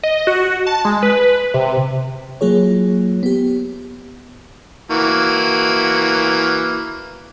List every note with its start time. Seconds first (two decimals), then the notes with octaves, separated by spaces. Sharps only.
0.03 D#5
0.27 F#4
0.67 A5
0.85 G#3
1.03 B4
1.54 C3
2.41 F#3 A#3 F4 G#4 C#5
3.23 B3 G4
4.91 E3 A#3 F#4